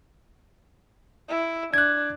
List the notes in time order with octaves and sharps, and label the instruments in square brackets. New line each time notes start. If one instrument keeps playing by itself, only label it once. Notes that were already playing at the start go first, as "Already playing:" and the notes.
[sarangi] E4
[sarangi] D4 [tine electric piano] F#6 G#6